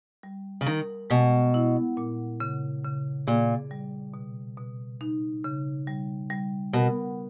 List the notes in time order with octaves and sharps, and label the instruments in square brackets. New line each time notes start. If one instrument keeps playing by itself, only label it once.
[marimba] G3
[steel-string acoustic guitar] C#3
[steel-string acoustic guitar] D#3 [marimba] A#4
[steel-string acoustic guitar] B2 [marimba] G#3
[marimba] E4
A#2
C#3
C#3
[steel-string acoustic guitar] A#2 [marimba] G#4
[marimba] G3
B2
B2
D#4
C#3
G3
G3
[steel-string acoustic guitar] B2 [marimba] A#4